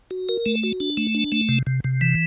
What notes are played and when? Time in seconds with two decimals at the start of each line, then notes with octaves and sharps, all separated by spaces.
0.11 F#4
0.29 A#4
0.46 A3
0.63 F#4
0.80 D4
0.97 A3
1.15 D4
1.32 A3
1.49 C3
1.67 C3
1.84 C3
2.01 E3